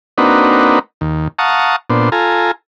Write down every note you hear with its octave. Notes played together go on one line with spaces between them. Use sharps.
A#3 C4 D4 D#4 F#4 B4
D#2
F5 F#5 A5 A#5 C#6 D#6
A#2 B3 D4 C5
F4 A4 G#5 A#5